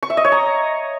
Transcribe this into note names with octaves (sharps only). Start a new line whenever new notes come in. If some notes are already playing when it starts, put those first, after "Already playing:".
C#6
E5
D#5
C#5
A#5